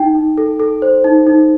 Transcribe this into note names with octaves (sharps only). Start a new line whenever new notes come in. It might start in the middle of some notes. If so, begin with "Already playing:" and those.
Already playing: D#4 G5
D#4
A4
A4
C5
D#4
D#4